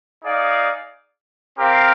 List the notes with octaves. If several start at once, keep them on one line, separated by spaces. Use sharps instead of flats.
D#4 G#4 D5 F5
C4 G4 A#4 F5